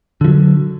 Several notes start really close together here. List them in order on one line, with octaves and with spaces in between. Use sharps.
D3 F3 F#3